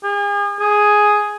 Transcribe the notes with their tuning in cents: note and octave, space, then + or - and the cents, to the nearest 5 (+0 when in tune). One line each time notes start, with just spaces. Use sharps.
G#4 -40
G#4 +5